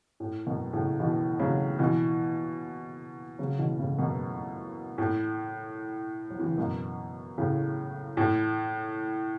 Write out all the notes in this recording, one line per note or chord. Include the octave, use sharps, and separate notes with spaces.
A2
F#2 B2
A2 C#3
B2 E3
C#3 F#3
B2 E3
C#3 F#3
B2 E3
A2 C#3
F#2 B2
A2
F#3
E3
C#3
F#2 B2
A2 C#3
A2